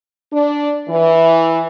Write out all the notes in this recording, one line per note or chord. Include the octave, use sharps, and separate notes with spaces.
D4
E3